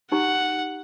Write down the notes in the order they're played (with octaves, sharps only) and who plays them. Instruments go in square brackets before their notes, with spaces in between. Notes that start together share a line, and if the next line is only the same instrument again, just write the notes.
[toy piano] D#4 G4 A#5 [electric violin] F#5